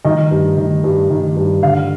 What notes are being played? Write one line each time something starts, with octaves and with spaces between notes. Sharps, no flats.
D#3 D#5
G2
D#3
G2
D#3
G2
D3 F5